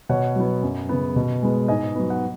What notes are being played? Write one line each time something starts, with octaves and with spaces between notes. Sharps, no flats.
B2 C#5 F#5
F#3 B3
F#2
C#3 B3
B2
G#3 B3
G#2 D#5 G#5
F#3 B3
F#5